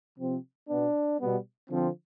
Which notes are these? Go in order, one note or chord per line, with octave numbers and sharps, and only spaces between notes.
C3 F3 C4
B2 B3 D4
B2 G3 B3
D3 F3 C4